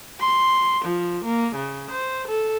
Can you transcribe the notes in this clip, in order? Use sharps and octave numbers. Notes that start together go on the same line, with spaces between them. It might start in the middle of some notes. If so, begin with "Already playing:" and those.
C6
F3
A#3
C#3
C5
A4